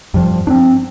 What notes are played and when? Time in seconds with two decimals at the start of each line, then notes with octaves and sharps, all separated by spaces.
0.14 G2 F3
0.47 C4 D4